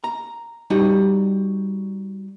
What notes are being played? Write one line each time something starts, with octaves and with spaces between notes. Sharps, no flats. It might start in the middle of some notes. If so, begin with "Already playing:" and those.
A#5
G3 D#4 F#4